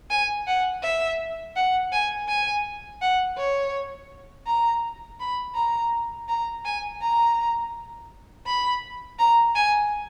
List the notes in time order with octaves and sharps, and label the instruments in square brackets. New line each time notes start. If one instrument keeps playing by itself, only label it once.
[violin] G#5
F#5
E5
F#5
G#5
G#5
F#5
C#5
A#5
B5
A#5
A#5
G#5
A#5
B5
A#5
G#5